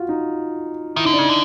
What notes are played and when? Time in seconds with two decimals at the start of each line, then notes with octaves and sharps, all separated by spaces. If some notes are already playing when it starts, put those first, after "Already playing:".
Already playing: F4 F#4
0.09 D#4
0.96 D#3 E4
1.05 D3 D#4
1.13 D4
1.18 C#3 D#4
1.29 D3